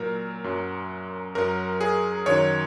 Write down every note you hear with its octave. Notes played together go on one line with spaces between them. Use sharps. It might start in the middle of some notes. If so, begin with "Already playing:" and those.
Already playing: A#2 F#3 A#4
F#2 F#3
F#2 F#3 A#4
G#4
F#2 D#3 F#3 C#5